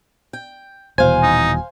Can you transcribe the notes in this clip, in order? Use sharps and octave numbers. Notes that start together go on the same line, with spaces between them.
G5
D#1 B2 E3 C5 F5 G#5
D#4